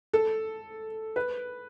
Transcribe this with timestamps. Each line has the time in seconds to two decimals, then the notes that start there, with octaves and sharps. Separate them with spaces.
0.13 A4
1.16 B4